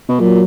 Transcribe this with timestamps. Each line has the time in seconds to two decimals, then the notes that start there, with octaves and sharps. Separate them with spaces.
0.09 B2
0.19 A#2 F#3